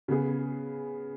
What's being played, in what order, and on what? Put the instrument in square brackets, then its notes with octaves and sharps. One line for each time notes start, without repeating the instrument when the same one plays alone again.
[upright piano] C#3 B3 G#4